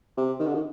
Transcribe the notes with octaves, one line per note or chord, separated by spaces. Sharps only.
C3
D#3
D3
D#3